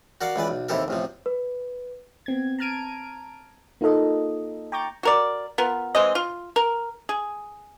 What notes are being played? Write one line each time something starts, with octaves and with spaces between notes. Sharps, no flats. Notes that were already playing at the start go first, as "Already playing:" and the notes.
F#4 A#4 D5 F5 F#5
C#2 E3 B4 D5
B1
D#2 C3 E4 G4 A4 A#4
A1 C3 F3
B4
B3 C4 G#6
A5 A#5 F6 G#6 D7 D#7
A#3 D#4 F4 A4 D#5
G5 A#5 C#6 D6 G6 A6
F#4 A#4 D5
B3 F4 A#4
E3 G#3 C4 D#5
F4
A#4
G#4